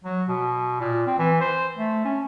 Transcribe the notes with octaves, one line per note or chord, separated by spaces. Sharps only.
F#3
B2
A#2
C4
E3
C5
A3
C#4